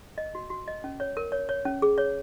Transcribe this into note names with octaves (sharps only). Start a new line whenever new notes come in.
D#5
F#4
F#4
D#5
C#4
C#5
A#4
C#5
C#5
C#4
G#4
C#5